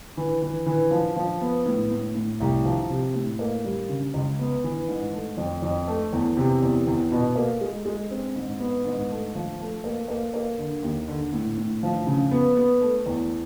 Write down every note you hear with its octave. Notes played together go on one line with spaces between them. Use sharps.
E3
E3
E3
F3
F3
B3
A2
A2
A2
C2
F3
C3
A2
A#3
G3
C#3
C#2
B3
E3
G#2
A3
F2
F2
A3
E2
C3
E2
E2
B2
A#3
G#3
G#3
C4
G#2
B3
G#2
A3
F3
A3
A#3
A#3
A#3
D3
D#2
D3
A2
A2
F3
C#3
B3
B3
A3
E2